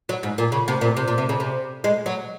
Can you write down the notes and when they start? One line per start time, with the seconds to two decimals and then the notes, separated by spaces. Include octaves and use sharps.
0.09 F#3
0.23 G#2
0.38 A#2
0.52 C#3
0.68 C3
0.81 A#2
0.97 C3
1.08 A#2
1.18 C3
1.29 C#3
1.40 C3
1.84 G#3
2.06 F#3